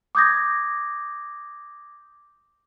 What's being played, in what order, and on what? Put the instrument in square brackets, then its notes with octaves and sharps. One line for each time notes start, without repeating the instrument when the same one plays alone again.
[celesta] D6 D#6 G6 G#6 A#6